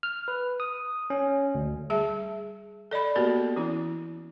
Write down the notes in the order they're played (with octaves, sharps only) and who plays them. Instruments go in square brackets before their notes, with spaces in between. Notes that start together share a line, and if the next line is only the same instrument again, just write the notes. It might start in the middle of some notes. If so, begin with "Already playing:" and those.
[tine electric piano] F6
B4
D#6
C#4
D2
[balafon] G3 G#4 E5 A5
A4 D5 D#5 B5
A#3 B3 F#4 G4 A4 A#4
E3 C#4 E4